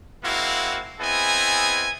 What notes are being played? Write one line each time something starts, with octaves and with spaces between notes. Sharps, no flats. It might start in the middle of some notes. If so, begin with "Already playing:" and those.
G#3 A#3 C4 E4 F#4 F5
B3 C4 E4 G#4 D#5 G#5